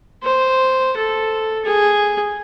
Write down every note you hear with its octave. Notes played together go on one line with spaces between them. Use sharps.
C5
A4
G#4